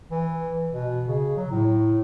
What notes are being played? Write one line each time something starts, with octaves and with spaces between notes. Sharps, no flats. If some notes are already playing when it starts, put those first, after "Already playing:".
E3
B2
C#3
F#3
A2